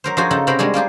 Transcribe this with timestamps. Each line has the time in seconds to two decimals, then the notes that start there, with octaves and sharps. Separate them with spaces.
0.04 F#3 A#4 C5
0.17 F3 D#4 F4 F#4 G#4 C5
0.31 C#3 D#4 A4 F#5
0.47 C3 F#4 A#4 C5 B5
0.59 G3 G#3 D4 F#4 G#4
0.74 A#3 F4 G4 G#4